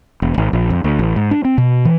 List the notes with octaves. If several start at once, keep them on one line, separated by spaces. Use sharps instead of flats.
E1
G#1
A#1
F2
D2
A1
G#2
D4
C4
B2
E3